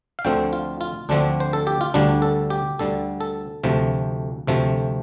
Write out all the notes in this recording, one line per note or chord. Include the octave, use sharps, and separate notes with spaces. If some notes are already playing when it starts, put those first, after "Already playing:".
F5
D2 D3 F3 A3 C4 G5
F4
F4
D2 D3 F3 A3 C4 D4
C5
A4
G4
F4
D2 D3 G3 D4
A4
G4
D2 D3 G3 A4
A4
D2 C3 F3 A3
D2 C3 F3 A3